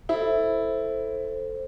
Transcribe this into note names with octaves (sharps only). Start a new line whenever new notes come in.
E4 A4 C5